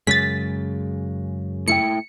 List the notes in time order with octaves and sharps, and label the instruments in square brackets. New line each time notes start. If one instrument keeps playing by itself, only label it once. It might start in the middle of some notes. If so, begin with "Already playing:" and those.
[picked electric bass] F#2 C#3 G#3 [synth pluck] A6 B6
[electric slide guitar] A2 E4 G5 [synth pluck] C#7